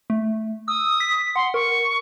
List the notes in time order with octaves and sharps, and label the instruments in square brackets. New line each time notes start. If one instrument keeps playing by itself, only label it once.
[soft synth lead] A3
[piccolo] D#6 [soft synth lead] E6
[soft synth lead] B6
[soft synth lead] F#5 [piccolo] C6
[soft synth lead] A#4 [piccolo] C#6